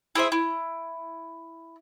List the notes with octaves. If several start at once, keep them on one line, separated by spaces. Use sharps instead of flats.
E4 G#4 C5 E5
E4